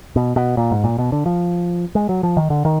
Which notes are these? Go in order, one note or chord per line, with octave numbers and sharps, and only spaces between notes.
B2
B2
A#2
G#2
A#2
B2
D3
F3
G#3
F#3
F3
D#3
D3
D#3